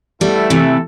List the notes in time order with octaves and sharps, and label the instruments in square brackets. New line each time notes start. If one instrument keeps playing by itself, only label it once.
[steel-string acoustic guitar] G3 B3 [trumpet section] A3 E4 A4 E5
[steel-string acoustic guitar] C3 E3